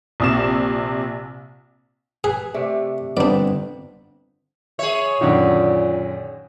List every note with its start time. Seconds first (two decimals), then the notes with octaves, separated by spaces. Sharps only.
0.20 A#1 C3 E7
2.24 G#4 B4
2.54 C3 A3 D4
3.17 G1 D3 B3 C4 D4 D5
4.79 G#4 C#5 E5
5.21 F#2 A#2 D3 D#3